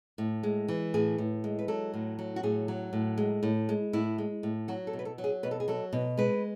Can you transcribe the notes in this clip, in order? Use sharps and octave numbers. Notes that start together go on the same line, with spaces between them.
A2
G#3
E3
A2 G#4
A2
G#3
B4
F#3 A4
A2
F#3
F#4
A2 G#4
F#3
A2
G#3
A2
G#3
A2 E4
G#3
A2
F#3 F#4
A4
B2
B4
A4
F#3
G#4
B2 B4
A4
G#4
F#3 A4
B2
G#3 B4